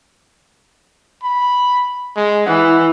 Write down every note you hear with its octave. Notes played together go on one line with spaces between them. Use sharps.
B5
G#3
E3 F#5